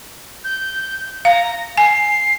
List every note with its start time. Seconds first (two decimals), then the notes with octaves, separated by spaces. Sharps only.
0.44 G6
1.25 F5 A#5
1.78 G#5 C7